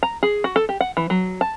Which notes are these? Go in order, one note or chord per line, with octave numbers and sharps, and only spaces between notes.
A#5
G#4
F#4
A4
G4
F#5
E3
F#3
A5